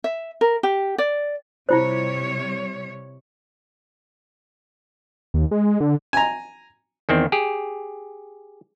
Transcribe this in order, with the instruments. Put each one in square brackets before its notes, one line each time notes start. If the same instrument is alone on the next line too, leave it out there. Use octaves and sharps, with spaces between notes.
[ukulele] E5
A#4
G4
D5
[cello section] C3 G3 C#5 [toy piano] E4 F4 C5
[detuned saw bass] D#2
G#3
D3
[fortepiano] G#5 A#5
[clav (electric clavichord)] E2 D#3 C4
G4 G#4